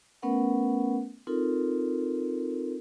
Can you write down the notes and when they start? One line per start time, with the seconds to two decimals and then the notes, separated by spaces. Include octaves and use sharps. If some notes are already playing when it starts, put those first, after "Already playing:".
0.22 A3 B3 C#4 A#4 B4 F#5
1.27 C4 D#4 F4 A4 A#4